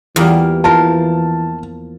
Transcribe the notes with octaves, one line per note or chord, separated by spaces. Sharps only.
E2 E3 G3 A#3 F4
F3 F4 A#4 A5